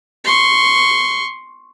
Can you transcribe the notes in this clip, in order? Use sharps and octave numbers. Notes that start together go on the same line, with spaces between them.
C6 C#6